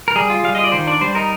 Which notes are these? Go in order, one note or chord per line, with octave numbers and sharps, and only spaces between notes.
A#4
G3 G#4
F4
G3 F5
F4 D#5
D5
D#3 C5
D4 D5
G3 C5
D#4 A#4